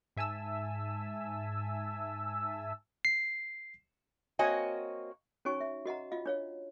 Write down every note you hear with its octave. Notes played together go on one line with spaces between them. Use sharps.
G#2 E5 G#5 A5 E6
C7
A#3 C4 F#4 C#5 D#5 G#5
C#4 D#4 F#4 C#5 G#5 C#6
E5
F#4 D#5 F#5 A#5
F4 D#5 F5
D4 C#5 F5